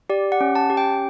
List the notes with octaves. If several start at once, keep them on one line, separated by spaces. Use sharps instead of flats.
G4 D5
F#5
C#4
A5
G4
G5